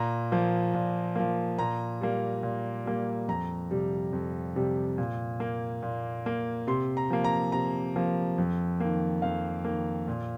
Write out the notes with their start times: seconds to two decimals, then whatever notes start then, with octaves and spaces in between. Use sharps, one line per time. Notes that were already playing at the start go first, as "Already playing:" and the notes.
Already playing: A#2 A#5
0.32 F3 A#3
0.74 A#2
1.16 F3 A#3
1.59 A#2 A#5
2.01 G3 A#3
2.43 A#2
2.86 G3 A#3
3.28 F2 A#5
3.71 C3 G3
4.13 F2
4.56 C3 G3
4.98 A#2
5.40 A#3
5.82 A#2
6.26 A#3
6.67 C3 C6
6.97 A#5
7.10 F3 A#3
7.24 A#5
7.52 C3 A#5
7.96 F3 A#3
8.38 F2
8.80 D#3 A#3
9.22 F2 F5
9.65 D#3 A#3
10.08 A#2